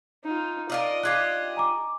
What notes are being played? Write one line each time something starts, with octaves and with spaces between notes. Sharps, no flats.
D#4 F4
D4 F4 A#4 D#5
D4 F4 G4 F#6 G#6 C7
G#5 A#5 D6